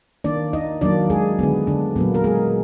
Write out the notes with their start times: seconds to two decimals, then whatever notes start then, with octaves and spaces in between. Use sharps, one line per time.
0.24 D#3 A#3 D4 D5
0.53 D#4 D#5
0.81 D#3 F#3 A#3 D4 D5
1.10 G#3 G#4
1.39 D3 G#3 B3
1.67 D3 D4
1.96 A#2 F#3 A#3 B3
2.14 A#4
2.24 G#3 G#4